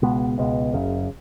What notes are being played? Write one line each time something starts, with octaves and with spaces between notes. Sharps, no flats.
C#2 B2 G#3 B3
C#2 B2 G#3 B3
F#1 F#2 C#3